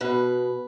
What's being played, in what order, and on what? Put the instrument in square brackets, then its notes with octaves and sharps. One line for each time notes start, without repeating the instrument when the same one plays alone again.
[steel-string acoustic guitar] B2 B4